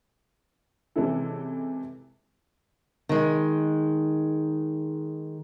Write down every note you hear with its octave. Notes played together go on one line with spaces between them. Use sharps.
C3 E3 G#3 C#4 E4 A4
D#3 G#3